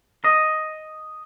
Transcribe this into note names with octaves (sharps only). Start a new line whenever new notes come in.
D#5